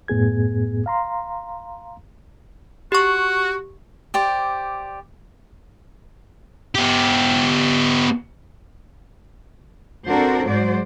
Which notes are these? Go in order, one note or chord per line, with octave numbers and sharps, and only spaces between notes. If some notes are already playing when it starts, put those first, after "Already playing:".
F#2 A2 B3 G#4 G#6
F5 A#5 C6
F#4 G4 C#6
G4 C5 D5
B3 G4
C4 D4 F#4 A4 A#4 C5
G#2 F#3 G#3 F#4 C5 D5